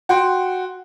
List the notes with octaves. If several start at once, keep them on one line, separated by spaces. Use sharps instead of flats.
F#4 G5 C6